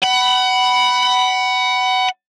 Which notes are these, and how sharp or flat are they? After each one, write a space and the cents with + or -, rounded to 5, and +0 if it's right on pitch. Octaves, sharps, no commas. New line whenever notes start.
F#5 +25 B5 +0